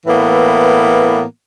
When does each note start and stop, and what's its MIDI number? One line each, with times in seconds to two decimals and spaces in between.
0.06 1.23 45
0.06 1.23 52
0.06 1.23 58
0.06 1.23 59